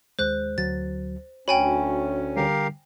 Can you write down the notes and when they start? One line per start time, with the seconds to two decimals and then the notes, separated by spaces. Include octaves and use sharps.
0.19 D#2 G#3 C5 F#6
0.58 D2 F#3 A6
1.48 D2 C#4 F#4 C#5 G5 G#5 B5
2.36 D3 G3 G4 A#4 F5